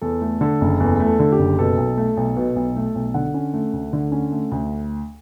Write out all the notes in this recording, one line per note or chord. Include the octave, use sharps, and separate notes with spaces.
E2 A4
A3
D3 A4
F#1
E2 A4
A3
A4
D3
G4
F#1
B2 A4
B1
A3
B1
B2
B1
A3
B1
D3 F#5
C#4
A3
D2
D3
C#4
A3
D2